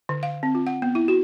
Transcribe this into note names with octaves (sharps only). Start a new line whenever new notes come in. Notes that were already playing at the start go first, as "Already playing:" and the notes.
D3
F5
C4
F4
F#5
B3
E4
F#4